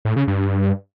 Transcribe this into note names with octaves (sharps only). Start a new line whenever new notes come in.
A2
C#3
G2